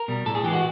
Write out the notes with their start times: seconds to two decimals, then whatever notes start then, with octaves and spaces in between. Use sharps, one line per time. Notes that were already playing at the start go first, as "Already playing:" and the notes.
Already playing: A#4
0.08 B2 G3
0.25 A2 A4
0.35 G#4
0.44 E3 G4
0.48 G#3
0.53 F#4